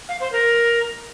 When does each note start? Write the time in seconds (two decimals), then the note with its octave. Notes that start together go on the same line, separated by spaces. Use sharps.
0.09 F5
0.20 C5
0.32 A#4